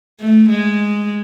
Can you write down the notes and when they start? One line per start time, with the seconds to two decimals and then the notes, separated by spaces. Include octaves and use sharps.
0.20 A3
0.50 G#3